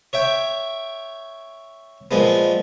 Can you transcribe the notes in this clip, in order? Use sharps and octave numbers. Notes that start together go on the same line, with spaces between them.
C#5 E5 G5
A#2 F3 G#3 B3